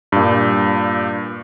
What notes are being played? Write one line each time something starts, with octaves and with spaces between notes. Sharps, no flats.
G2 A#2